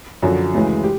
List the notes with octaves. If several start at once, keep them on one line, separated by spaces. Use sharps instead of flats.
F#2 D3 F3 F#4
D2 C#3 E3 G#3
G4